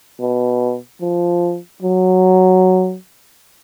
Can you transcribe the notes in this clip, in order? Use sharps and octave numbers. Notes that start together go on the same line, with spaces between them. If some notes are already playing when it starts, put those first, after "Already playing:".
B2
F3
F#3